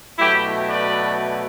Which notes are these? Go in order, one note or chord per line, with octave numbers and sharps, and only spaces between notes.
B2 F#3 A3 E4 G4
B4 D5